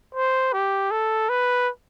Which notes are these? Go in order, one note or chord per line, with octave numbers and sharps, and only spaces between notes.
C5
G4
A4
B4